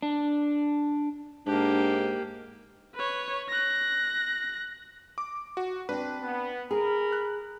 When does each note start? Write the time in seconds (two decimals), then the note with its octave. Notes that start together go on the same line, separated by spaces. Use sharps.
0.02 D4
1.46 G#2 A#3 D4 G4
2.95 B4 C#5
3.49 F#6 A#6
5.18 D6
5.57 F#4
5.89 C4 D4 B4
6.23 B3
6.71 G#4 A#4 B5
7.12 F#6